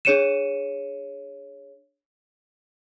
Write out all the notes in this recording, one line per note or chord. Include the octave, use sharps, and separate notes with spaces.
D4 G#4 C#5 C#7 D#7 E7